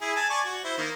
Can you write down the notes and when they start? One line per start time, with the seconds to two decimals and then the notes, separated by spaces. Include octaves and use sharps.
0.01 E4 G#4
0.16 G#5 A5
0.30 D5 G#5 C#6
0.45 F#4
0.64 E4 C5
0.77 D#3 A#3